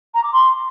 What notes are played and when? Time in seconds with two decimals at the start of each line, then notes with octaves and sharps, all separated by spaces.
0.14 A#5
0.23 D6
0.32 C6